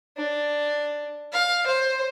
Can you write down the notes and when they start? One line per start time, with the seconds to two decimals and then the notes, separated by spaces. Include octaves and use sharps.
0.17 D4
1.33 F5
1.67 C5